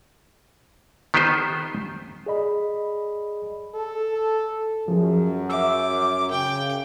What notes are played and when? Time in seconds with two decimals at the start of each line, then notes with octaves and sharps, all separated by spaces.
1.14 D#3 B3 G4 A4 B4 C5
2.26 G#4 D5 D#5 B5
3.75 A4
4.88 F#2 F3 G#4
5.50 E5 D6 E6
6.31 C#3 G5